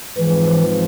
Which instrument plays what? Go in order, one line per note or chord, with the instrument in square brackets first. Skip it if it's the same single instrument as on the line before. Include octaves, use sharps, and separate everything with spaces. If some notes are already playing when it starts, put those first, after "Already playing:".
[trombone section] G#2 F3 C4 [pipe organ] E3